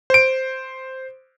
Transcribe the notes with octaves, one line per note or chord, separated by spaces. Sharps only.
C5 D7